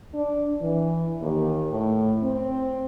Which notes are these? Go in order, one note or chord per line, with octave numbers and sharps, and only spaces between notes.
D4
E3
D#2
A2
C4